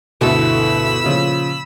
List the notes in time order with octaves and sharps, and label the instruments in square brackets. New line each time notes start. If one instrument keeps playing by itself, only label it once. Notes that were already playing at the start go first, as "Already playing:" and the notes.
[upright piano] G1 D2 B2 [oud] B3 E4 A4 [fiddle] B5 E6
[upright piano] A#2 C#3 F3